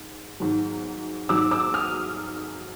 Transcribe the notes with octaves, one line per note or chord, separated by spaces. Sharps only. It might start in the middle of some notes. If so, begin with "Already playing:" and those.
Already playing: G#2
G#2 D#3 F#3
G#2 D#3 F#3 D6 E6
D6 E6
D#6 F6